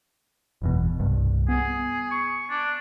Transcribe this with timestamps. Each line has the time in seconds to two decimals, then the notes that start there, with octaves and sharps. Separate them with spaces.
0.62 F#1 E2 B2
1.00 C2 G2
1.49 B3 G#4
2.11 C#6
2.50 D4